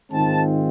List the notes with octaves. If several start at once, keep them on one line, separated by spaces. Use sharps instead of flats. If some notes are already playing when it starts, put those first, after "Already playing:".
G#2 D#3 G#3 C4 F4 A5